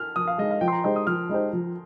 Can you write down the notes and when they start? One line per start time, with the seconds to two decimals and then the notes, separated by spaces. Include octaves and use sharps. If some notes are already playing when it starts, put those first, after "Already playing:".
Already playing: F6
0.16 F3 D#6
0.27 F5
0.38 G#3 D#4 D#5
0.51 F5
0.61 F3 G5
0.68 C6
0.72 A#5
0.84 G#3 D#4 G4 C5 C6
0.96 D#6
1.07 F3 F6
1.29 G#3 D#4 G4 C5
1.53 F3